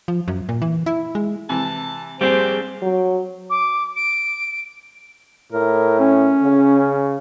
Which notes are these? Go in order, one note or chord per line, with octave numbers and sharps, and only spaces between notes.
F3
F#2
A#2
E3
E4
G#3
C3 E3 A5
A#1 G3 C4 G4 G#4 C5
F#3
D6
D7
A2 A#4
C#4
C#3